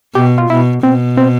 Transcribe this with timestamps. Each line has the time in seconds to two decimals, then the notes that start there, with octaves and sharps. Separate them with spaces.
0.15 B2 G4
0.38 F4
0.49 B2 E4
0.83 B2 C4
1.17 C4